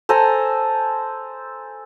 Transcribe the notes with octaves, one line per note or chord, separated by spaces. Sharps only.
A4 C5 G#5 A#5